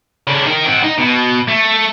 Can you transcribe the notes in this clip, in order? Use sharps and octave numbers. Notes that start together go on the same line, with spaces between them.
C#3 D4
D#4 A#4
C4 F#4
D#4
B2
A3